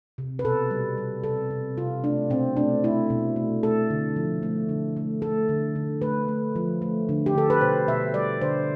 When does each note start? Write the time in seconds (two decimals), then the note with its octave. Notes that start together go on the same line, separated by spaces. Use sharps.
0.18 C3
0.39 B4
0.44 B2 A4
0.71 G3
0.98 G3
1.24 C3 A4
1.51 C3
1.77 C3 F4
2.04 A3 D4
2.30 B2 C4
2.57 A3 D4
2.84 A3 E4
3.10 B2
3.36 A3
3.63 A3 A4
3.90 D3
4.16 F3
4.43 A3
4.69 D3
4.97 A3
5.22 A3 A4
5.49 D3
5.75 D3
6.02 A3 B4
6.28 A3
6.56 F3
6.82 A3
7.09 D3
7.26 G4
7.35 D3 A4
7.50 B4
7.61 B2 C5
7.88 B2 E5
8.14 G3 D5
8.41 D3 C5